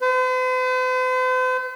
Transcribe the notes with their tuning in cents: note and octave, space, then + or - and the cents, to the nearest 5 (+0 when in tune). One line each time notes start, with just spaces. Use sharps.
C5 -45